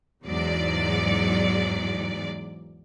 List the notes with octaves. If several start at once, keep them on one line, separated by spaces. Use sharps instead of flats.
E2 G#2 F#3 D5